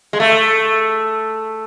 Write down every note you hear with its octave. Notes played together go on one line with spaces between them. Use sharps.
G#3
A3